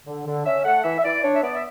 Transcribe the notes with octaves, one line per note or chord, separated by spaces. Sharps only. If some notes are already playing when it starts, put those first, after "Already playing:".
D3
D3
C#4 E5
A3 F#5
E3 E5
E5
E3 D5
D4 C#5
E5
B3 D5
E5